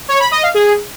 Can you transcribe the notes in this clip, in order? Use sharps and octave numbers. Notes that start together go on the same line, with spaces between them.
C#5
B5
D#5
F5
G#4